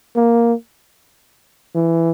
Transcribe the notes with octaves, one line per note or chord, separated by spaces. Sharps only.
A#3
E3